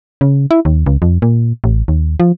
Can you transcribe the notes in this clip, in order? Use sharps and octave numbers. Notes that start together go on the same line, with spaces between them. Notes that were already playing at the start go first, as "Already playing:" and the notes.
C#3
E4
D#2
C#2
F2
A#2
A1
D#2
F3